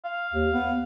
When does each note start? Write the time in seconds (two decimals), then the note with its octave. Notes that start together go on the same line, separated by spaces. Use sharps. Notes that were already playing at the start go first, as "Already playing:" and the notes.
0.04 F5
0.33 D#2
0.53 B3